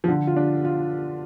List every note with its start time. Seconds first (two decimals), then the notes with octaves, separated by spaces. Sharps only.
0.04 F3
0.08 D3
0.27 F4
0.36 D4
0.65 F4